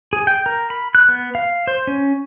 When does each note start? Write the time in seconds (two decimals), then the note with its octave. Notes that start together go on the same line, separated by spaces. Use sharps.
0.13 G#4
0.27 G5
0.46 A#4
0.70 B5
0.95 F#6
1.09 B3
1.35 F5
1.67 C5
1.87 C#4